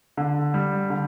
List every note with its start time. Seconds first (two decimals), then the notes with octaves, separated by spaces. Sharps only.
0.17 D3
0.54 G3
0.90 D3